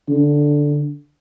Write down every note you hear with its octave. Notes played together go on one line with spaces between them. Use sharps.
D3